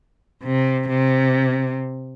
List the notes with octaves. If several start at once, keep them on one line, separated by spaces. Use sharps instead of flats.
C3
C3